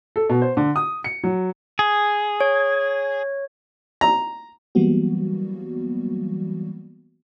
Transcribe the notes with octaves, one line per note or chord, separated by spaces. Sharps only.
A4
B2
C5
D3
D#6
C#7
F#3
G#4
C#5
A#5
E3 F#3 G3 A#3 B3 F#4